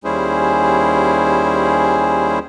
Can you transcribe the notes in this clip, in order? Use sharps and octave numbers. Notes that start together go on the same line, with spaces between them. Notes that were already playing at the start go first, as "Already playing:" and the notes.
D#2 G3 C#4 E4 G#4 C5